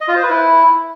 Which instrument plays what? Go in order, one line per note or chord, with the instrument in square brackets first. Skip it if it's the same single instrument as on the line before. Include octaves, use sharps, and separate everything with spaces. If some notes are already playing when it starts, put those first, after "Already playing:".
[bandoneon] D#5
F4
C5
B4
E4